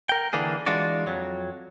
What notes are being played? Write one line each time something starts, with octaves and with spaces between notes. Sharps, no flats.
A#4 G5
D3 E3 A#3 D4 G#4
E3 G#3 D4 F4 F#4 D5
F2 F#3